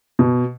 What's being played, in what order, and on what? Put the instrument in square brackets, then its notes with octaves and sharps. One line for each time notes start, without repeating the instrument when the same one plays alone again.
[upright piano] B2